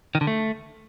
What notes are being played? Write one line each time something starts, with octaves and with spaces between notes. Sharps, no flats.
D#3
D3
A3